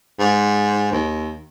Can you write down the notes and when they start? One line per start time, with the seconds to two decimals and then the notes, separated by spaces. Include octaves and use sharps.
0.19 G#2
0.92 D#2